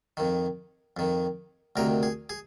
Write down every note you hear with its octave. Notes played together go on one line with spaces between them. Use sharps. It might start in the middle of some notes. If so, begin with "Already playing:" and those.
F2 D#3
F2 D#3
D2 C3 D#3 A#4
G#4
G#4